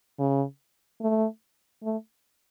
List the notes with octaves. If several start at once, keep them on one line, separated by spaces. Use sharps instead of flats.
C#3
A3
A3